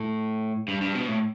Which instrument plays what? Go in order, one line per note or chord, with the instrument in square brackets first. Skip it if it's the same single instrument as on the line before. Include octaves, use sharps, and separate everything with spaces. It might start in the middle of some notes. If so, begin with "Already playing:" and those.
Already playing: [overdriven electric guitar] A2
G2
G2
B2
A2